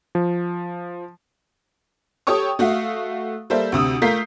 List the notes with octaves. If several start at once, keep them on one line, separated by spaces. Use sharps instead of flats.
F3
G4 A4 C#5 G5 C#6 D#6
A3 F#4 E5 F5
G3 A#3 A4 C5 E5
D2 C3 D#6 E6
A3 F4 A#4 G6 B6 C7